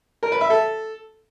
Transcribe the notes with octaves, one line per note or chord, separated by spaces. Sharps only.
A#4
B4
E5
A4